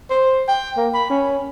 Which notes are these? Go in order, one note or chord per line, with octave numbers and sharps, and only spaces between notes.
C5
G5
A#3
B5
C#4